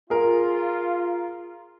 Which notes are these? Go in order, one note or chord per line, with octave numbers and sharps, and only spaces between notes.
F4 G#4 A#4